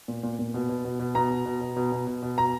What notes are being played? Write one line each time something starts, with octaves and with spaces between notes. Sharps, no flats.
A#2
A#2
A#2
B2
B2
B2
B2
B2 A#5
B2
B2
B2
B2
B2
B2
B2
B2 A#5